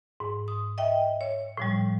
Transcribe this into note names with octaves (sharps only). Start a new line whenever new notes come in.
G#2
D#6
D#5 E5 G5
C#5
A2 F3 G3